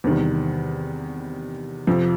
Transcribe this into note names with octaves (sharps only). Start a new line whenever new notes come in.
E2 C3 D#3 G3
F2 C3 F3